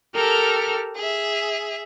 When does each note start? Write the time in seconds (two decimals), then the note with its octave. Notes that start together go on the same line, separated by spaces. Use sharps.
0.14 G4 A4 A#4 A#5 F6
0.95 G#4 E5